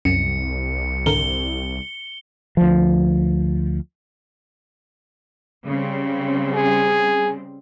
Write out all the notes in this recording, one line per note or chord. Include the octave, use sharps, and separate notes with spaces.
C2 F#2 C#7
G#1 D3 A#4 G7
D2 F3
C#3 G3 C4
G#4